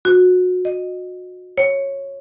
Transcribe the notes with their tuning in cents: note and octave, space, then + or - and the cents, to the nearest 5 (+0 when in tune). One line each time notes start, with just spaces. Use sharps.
F#4 -25
D#5 -15
C#5 -10